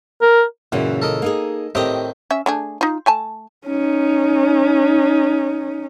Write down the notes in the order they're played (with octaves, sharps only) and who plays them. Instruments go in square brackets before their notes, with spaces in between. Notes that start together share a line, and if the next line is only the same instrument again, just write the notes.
[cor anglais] A#4
[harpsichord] F#2 [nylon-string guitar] A#2 C#3 E3
[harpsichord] A4 A#4 D#5
[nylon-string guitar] A#3 D#4 G#4
[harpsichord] A2 D#3 C4 [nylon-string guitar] G4 D#5
[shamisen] C#4 E5
A3 D4 G#4
D#4 F4
A3 G#5 A5
[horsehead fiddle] C#4 D#4